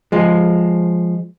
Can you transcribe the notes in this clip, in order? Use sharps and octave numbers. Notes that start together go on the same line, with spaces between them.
F3 G#3